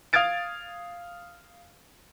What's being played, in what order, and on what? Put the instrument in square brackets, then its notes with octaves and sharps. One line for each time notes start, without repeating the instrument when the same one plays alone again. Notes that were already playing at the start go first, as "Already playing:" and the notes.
[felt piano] F5 D#6 F6 G#6 A6 D7